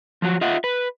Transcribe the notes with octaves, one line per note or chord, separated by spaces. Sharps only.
F3 F#3 F#4
F4 D#5 E5 F#5
B4